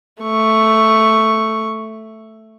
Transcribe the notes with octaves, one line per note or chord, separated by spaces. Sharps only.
A3 C#6